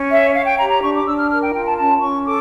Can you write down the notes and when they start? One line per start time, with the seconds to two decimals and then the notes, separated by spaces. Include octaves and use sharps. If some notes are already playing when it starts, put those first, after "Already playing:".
Already playing: C#4
0.11 C#5 E5
0.35 C#5 F5
0.47 G5
0.59 G4 A#5
0.70 A#5
0.82 D4 C#6
0.95 D6
1.06 D4 E6
1.18 F6
1.30 A#4 F6
1.42 G5
1.54 F4 G5
1.66 A5
1.78 C#4 A5
2.02 C#4 C#6
2.25 A4 D6